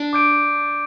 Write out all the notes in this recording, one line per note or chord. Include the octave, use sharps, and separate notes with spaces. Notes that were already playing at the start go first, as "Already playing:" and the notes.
Already playing: D4
D6 G6 D7